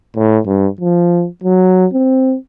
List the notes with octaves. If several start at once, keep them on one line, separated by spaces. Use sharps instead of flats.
A2
G2
F3
F#3
C4